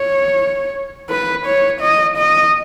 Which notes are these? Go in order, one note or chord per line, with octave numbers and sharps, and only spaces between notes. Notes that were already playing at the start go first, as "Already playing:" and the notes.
Already playing: C#5
B4
C#5
D#5
D#5